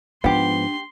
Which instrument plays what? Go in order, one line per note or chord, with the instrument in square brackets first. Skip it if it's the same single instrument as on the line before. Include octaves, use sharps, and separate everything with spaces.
[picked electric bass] G#2 F3 B3 [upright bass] D4 [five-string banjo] G4 F#5 [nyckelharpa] C6